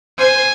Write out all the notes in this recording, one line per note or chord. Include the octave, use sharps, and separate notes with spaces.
C5 G#5